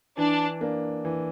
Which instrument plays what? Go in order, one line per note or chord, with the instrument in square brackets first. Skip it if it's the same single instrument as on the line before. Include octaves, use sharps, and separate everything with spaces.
[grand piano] E3 [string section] D4
[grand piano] A#3 D4
E3